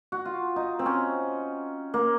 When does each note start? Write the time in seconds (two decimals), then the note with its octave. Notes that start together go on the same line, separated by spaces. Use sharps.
0.12 F#4
0.25 F4
0.56 D#4
0.79 C4
0.86 C#4
1.94 A#3